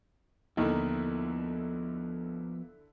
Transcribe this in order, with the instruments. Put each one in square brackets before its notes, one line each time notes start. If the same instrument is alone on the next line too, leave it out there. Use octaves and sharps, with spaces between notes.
[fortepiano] D#2 D#3 [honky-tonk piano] D3 E4 [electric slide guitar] F3 B3 A#5